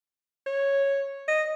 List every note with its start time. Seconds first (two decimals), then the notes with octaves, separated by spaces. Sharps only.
0.47 C#5
1.28 D#5